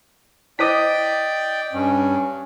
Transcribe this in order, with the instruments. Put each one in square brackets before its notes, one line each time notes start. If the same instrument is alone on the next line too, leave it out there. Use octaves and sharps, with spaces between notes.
[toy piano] E4 C5 D6 [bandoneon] D5 G5 [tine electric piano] D#5 D#6 B6
[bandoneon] G2 [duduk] C#4